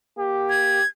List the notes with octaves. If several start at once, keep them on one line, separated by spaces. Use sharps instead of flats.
A#3 G4
G#6